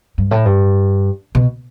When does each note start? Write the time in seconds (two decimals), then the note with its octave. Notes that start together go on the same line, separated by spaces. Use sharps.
0.18 G2
0.31 A2
0.45 G2
1.35 B2